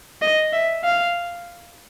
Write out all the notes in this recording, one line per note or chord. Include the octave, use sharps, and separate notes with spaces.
D#5
E5
F5